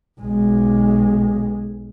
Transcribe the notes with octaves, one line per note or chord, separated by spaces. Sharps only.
B1 G#3